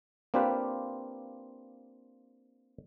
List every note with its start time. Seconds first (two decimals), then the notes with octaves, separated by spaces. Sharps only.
0.34 A#3 C4 D4 F4 G4 B4